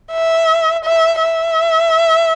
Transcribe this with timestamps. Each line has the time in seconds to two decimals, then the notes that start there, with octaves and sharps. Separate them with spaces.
0.12 E5
0.84 E5
1.20 E5